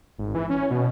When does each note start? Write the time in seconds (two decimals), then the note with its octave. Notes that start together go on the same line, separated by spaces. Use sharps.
0.18 G#1
0.35 E3
0.50 C#4
0.70 B2